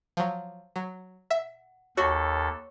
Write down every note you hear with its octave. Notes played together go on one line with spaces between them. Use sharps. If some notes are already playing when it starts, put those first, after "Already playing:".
F3 F#3
F#3
E5 F#5
D#2 F#4 A4 C#5 F#5 C#6